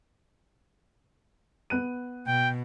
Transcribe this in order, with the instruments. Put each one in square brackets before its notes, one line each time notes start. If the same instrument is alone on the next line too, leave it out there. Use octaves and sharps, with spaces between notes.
[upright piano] B3 F#6 D#7
[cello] B2 [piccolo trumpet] G5